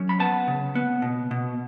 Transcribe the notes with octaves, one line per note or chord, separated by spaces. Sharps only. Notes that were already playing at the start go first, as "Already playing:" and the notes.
Already playing: F#3 C#4
B5
B3 A5
C#3
B3
B2
B2